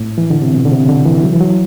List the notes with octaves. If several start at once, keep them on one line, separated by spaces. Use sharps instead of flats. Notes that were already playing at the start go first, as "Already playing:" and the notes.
Already playing: A2
E3
D3
C3
B2
D3
C3
D3
E3
F#3
E3
F#3